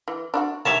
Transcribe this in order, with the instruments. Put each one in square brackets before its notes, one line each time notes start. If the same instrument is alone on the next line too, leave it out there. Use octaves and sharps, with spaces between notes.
[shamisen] E3
D4 E4 F#4
[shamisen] D#3 G4 [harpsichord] C#5 E5 A5